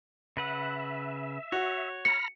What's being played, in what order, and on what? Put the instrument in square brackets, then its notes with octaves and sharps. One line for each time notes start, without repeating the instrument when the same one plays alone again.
[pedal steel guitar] C#3 B4 F#5 [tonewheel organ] E5
[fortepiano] F#4 [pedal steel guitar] C#5
[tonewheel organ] A#5 B5 F6 [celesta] C#7